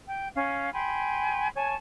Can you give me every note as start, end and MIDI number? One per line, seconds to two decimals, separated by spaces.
0.09 0.29 79
0.36 0.72 61
0.36 0.72 77
0.73 1.48 79
0.73 1.48 80
0.73 1.48 83
0.73 1.48 84
1.56 1.75 73
1.56 1.75 80
1.56 1.75 81
1.56 1.75 85